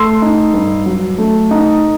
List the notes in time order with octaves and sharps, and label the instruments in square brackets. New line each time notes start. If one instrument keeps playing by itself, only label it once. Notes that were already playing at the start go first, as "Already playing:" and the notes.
Already playing: [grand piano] A3 C6 E6
D#4
G2
F#3
A3
D#4